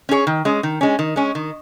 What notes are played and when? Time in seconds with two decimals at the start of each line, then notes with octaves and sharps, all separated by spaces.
0.09 C#4 G#4 C#5
0.27 D#3
0.45 G#3 C#4
0.63 D#3
0.81 G#3 C#4
0.99 D#3
1.16 G#3 C#4
1.35 D#3